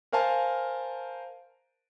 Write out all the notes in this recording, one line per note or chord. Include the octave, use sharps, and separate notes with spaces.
A#4 C5 F5 G#5 A5